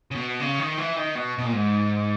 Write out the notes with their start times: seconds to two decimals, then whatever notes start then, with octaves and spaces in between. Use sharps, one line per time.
0.11 C#3
0.15 B2
0.40 C#3
0.59 D#3
0.78 E3
0.97 D#3
1.15 B2
1.38 B2
1.45 A#2
1.53 G#2